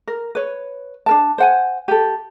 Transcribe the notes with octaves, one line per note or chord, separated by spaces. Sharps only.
A#4
B4 C#5
D4 A#4 A5
C5 F#5 G#5
G4 A4